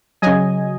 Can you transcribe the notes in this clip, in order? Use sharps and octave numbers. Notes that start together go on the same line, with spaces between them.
C#3 F#3 D#5 G#5